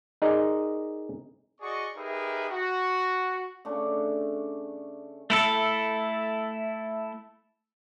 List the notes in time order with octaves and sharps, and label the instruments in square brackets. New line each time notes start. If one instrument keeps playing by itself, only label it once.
[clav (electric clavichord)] D#4 G#4 A#4 D5 D#5
[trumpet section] F#4 G#4 D5 D#5 C#6
D#4 G4 G#4 A#4 B4 E5
F#4
[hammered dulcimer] C#3 A3 D4
[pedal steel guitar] A3 E4 A4